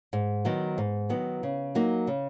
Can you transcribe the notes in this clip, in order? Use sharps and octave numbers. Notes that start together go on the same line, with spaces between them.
G#2
D#3 F#3 B3
G#2
D#3 F#3 B3
C#3
F#3 A#3 D#4
C#3